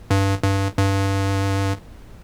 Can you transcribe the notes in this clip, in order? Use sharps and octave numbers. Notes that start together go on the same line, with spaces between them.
G2
G2
G2